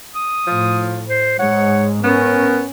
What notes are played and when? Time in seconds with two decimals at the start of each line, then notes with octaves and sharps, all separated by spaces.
0.14 D#6
0.47 A2 F3
1.08 C5
1.39 G#2 G#3 C#5 F#5
2.04 B3 C#4 A#4